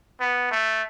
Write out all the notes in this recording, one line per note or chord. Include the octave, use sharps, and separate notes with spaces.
B3
A3